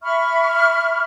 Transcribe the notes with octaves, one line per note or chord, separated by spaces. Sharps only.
E5 B5 C#6 F6